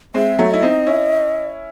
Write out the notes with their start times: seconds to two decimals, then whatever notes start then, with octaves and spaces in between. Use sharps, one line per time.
0.14 G#3 C4 E5
0.39 F#3 A3
0.51 E4 D#5
0.62 C4 D#4
0.86 C#4 E4